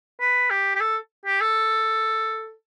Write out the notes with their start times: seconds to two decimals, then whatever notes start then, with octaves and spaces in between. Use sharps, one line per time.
0.20 B4
0.50 G4
0.75 G4
0.81 A4
1.26 G4
1.41 A4